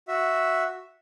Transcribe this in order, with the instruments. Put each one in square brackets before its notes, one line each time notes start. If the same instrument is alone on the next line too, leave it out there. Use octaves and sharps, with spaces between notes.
[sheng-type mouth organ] F#4 E5